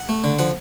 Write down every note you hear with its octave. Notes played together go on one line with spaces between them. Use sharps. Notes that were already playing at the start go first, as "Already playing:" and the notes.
Already playing: F#5
A3
D3
F3 F#5